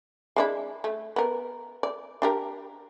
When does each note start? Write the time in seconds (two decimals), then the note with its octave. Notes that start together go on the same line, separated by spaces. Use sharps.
0.36 G#3 D4 E4
0.84 A3
1.16 B3 A#4
1.83 D5
2.22 D4 G4 A#4